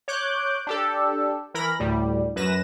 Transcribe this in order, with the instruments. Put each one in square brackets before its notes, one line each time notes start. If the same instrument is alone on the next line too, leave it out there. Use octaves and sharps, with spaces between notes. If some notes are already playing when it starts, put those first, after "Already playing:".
[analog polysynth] C#5 D6 F#6 G6
D4 G4 A4
E3 A#4 B5 A#6
D2 A2 G3
F#2 B4 A#6 E7